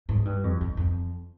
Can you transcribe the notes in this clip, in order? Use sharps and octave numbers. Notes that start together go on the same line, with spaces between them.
G#2
G2
F2
F2
F2